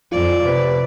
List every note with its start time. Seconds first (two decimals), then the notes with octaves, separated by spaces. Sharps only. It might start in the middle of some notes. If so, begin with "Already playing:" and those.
0.12 F2 F4 D5
0.46 C3 B4